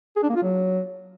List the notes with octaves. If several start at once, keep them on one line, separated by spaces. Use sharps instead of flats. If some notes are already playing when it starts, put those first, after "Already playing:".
G#4
D4
A#3
F4
F#3